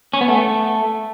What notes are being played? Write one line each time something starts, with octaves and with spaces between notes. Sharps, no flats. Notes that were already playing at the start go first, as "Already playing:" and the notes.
C#4
B3
A3